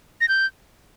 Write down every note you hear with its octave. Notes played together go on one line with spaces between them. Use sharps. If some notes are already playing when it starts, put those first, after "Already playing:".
A#6
G6